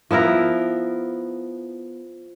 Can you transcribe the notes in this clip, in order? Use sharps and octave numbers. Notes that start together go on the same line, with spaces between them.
F3 B3 E4 A#4